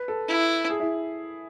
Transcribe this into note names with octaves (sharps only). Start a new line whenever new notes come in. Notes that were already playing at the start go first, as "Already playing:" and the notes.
Already playing: B4
A4
E4
G#4
E4